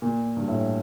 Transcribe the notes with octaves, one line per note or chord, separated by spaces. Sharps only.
A#2
G2
A2